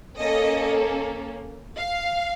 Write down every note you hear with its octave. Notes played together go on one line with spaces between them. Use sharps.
A#3 C#4 A4 D#5
F5